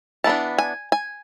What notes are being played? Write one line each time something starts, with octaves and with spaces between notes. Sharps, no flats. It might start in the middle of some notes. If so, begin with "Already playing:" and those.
E3 B3 D4 A5
G#5
G#5